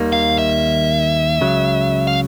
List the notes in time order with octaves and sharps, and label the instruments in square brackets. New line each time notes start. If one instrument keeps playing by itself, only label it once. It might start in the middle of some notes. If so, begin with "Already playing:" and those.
Already playing: [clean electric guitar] D#2 D#3 G3 A#3
[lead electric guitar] F5
E5
[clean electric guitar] C#2 C#3 F#3
[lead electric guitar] F5